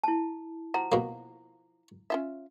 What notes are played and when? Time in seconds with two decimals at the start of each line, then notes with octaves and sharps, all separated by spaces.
0.04 E4 A5
0.74 F3 F#4 A#5
0.92 B2 A#3
2.10 C#4 F4 E5